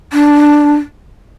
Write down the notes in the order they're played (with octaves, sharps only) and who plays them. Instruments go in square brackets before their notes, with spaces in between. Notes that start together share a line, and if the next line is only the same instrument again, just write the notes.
[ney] D4